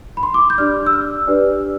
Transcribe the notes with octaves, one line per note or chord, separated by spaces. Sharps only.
B5
C6
D6
G6
D4 G4 D5 F6
E6
F6
D4 G4 B4 D5